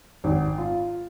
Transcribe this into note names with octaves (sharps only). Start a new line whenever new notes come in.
G#1
F4